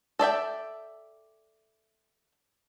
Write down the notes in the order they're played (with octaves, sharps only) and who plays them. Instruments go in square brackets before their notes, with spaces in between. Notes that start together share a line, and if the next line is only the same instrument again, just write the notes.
[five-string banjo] A4 D5 E5 G5